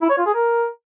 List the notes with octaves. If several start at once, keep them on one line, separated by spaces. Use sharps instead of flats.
E4
C#5
F4
G#4
A#4